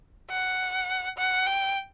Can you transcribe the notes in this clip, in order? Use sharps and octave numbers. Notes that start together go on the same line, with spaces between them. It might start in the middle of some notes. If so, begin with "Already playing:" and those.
F#5
F#5
G5